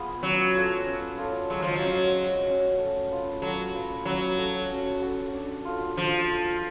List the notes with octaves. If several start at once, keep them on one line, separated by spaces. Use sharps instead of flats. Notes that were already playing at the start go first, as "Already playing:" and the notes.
Already playing: B3 F4 G#4
F#3 C#4
F4 A4 D5
C#4
F4 A4 D5
F#3 G#3
F3
F#3
C#4 F#4 C#5
G#3
C#4 F#4 C#5
A3
F4 B4
F#3 A3
F4 B4
F#3 C#4
F#4 A4
C#4
F#4 A4
D4
F4 A4
F3 D4
F4 A4